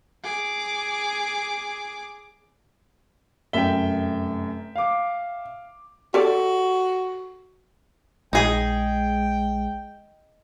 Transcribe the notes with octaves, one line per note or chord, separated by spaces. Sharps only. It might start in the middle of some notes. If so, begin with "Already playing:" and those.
G#4 D6
F1 F#2 E5 G5 G7
F5 D6
F#4 G4 A4 D5
A#1 G#3 D#4 G#4 G5